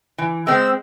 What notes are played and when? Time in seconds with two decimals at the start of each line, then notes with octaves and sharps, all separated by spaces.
0.18 E3
0.47 G#3 C4 E6